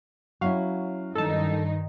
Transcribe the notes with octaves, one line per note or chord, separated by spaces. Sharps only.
F#3 C#4 E4 F#4 F5
G2 D#3 D#4 A4 A5